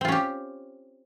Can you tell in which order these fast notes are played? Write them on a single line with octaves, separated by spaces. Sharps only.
C4 F4 C#4 G4